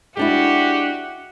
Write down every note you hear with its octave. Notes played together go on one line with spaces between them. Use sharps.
G#3 D4 E4 F#4 G4